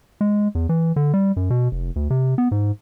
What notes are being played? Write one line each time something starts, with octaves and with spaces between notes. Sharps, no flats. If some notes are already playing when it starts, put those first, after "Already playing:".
G#3
E2
E3
D3
G3
F#2
B2
F1
D2
C3
B3
G#2